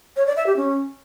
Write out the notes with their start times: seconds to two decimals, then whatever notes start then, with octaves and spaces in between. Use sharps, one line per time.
0.16 C#5
0.26 D5
0.36 E5
0.46 G4
0.56 C#4